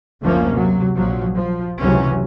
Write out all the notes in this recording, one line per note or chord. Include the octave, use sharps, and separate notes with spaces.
F#1 D2 F3 A3 A#3 C#4
C3 F#3
A#1 F3 F#3
F3
F1 C#2 C3 E3 F#3 C#4